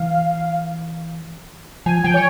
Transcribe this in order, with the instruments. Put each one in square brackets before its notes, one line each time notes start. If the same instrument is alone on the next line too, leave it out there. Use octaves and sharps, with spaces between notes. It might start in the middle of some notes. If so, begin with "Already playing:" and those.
Already playing: [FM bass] E3 [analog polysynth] F5
[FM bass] F3 [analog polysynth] G#5
[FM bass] F3 [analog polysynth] G5
[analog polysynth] C#5